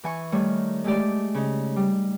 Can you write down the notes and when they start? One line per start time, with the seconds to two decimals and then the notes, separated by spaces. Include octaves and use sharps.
0.04 E3 G#5 C#6
0.32 D#3 G3 A3 C#5
0.84 G#3 A3 G4 D5
1.34 C#3 D#4
1.76 G3